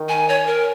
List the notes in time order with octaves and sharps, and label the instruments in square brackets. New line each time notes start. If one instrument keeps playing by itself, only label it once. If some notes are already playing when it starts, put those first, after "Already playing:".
Already playing: [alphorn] D#3
[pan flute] G#5
C#5
A#4